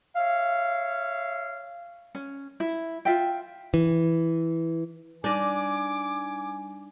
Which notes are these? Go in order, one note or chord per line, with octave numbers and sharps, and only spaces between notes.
C#5 E5 F5
C#4
E4
F4 E5 G5
E3
G3 D4 D#4 G#5 D6